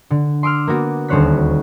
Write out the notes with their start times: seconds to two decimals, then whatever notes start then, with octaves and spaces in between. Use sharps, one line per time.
0.10 D3
0.43 C6 D6 E6 F6
0.68 A#3 B3 F#4
1.08 D#1 D2 C5 C#5 F#6 B6